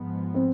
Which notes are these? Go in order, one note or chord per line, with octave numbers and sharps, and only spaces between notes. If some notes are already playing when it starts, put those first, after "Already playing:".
Already playing: G#2 F3 G#3 B3
C4